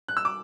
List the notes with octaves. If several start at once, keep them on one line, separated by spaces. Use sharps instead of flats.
F#6
E6
D6